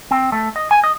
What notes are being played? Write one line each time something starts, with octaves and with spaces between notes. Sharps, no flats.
C4
A3
D#5
G#5
D#5